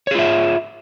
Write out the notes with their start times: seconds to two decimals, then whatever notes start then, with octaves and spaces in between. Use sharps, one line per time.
0.07 C#5
0.11 G#4
0.15 F4
0.19 E5